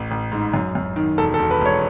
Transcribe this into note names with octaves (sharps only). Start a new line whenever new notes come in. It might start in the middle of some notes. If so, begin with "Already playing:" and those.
Already playing: A1
A1
G#2
F#2
F#2
D#3
E1 A4
A4
E1
B4
E1 C#5